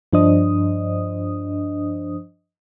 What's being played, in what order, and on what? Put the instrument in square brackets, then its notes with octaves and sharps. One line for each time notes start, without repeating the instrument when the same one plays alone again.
[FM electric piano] G2 F3 D4 C5 D#5 D#6